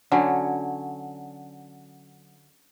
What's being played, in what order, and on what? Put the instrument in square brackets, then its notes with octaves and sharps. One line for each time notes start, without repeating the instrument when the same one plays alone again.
[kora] D3 F#3 C#4